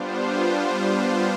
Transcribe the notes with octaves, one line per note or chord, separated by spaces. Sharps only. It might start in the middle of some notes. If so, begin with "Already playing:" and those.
Already playing: G3 B3 D4 F4 C5